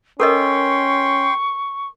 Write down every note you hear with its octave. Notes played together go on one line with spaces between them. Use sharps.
C#4 A4 A#4 D#5 G5 C6 C#6